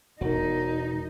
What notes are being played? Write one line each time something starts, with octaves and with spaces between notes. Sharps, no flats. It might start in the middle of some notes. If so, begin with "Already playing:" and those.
E1 D#4 F#4 A#4